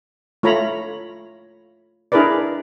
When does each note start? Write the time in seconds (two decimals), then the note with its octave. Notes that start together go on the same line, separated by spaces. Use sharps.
0.43 A3 F4 C#5 A#5 B5
2.12 D4 E4 G#4 A#4 B4 D5